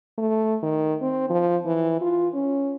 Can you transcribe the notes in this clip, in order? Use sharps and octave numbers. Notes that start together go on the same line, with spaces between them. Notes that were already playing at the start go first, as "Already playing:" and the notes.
A3
D#3
C4
F3
E3
F4
C#4